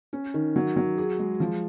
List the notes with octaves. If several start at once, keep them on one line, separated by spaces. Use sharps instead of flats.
C#4
D#3
F#3
F#3
G#4
G#3
F3